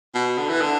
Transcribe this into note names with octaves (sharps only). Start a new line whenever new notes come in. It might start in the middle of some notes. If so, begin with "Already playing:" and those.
B2
D3
E3
D3